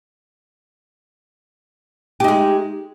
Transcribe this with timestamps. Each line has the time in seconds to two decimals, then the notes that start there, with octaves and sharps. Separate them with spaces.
2.20 G4
2.24 D#4
2.28 G#3